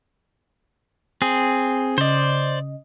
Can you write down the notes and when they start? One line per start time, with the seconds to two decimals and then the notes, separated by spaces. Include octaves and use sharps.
1.22 C4 G#4
1.98 C#3 C5 D5 D#5